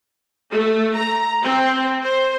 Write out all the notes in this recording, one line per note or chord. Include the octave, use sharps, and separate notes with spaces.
A3
A#5
C4
C5